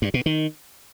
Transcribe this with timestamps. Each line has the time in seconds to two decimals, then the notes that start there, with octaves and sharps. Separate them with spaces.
0.02 G2
0.14 B2
0.26 D#3